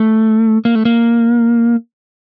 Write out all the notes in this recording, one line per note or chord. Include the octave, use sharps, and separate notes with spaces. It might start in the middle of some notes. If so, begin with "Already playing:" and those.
Already playing: A3
A#3
A3
A#3